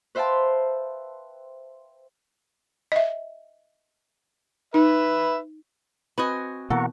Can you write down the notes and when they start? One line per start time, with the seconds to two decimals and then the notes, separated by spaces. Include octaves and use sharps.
0.15 B4 C5 E5 F5 G5 A5
2.92 D#5 E5
4.74 D#4 B4 E5
6.18 C4 F#4 B4 D#5 G#5
6.70 B2 E3 A#3 A4 F#5 A#5 C#6